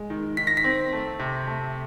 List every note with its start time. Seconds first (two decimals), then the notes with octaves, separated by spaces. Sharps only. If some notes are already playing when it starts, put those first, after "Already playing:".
Already playing: G#3
0.10 D#3
0.37 D#3 B6
0.47 A#6
0.57 B6
0.64 C4
0.93 A3
1.19 C3
1.47 A3